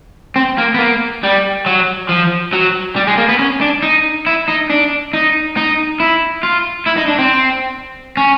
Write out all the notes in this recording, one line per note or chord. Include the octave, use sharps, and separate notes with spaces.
C4
A#3
B3
A#3
G3
F#3
F3
F#3
G3
G#3
A#3
B3
C#4
D4
D#4
E4
D#4
D4
D#4
D#4
E4
F4
E4
D#4
D4
C4
C#4